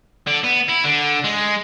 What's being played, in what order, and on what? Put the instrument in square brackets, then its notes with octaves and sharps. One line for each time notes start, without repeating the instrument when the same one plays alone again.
[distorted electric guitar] D3
B3
E4
D3
G#3